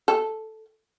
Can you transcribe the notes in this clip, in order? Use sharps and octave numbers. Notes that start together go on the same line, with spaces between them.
A4